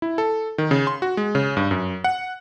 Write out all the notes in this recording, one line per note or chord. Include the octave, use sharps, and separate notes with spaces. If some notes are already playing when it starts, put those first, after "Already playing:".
E4
A4
D#3
C#3
C6
F#4
G#3
C#3
G2
F#2
F#5